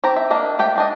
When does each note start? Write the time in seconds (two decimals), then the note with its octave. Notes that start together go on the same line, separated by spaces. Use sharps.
0.04 C4 G4 A#5
0.16 E5
0.30 A#3 D4 D#5 E5
0.59 A3 G4 G5
0.76 G#3 D4 D#5